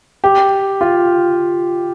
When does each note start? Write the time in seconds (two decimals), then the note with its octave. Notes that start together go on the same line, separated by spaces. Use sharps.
0.24 G4
0.81 F4